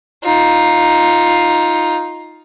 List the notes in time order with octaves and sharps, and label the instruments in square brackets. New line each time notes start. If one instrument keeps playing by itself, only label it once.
[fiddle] D#4 F4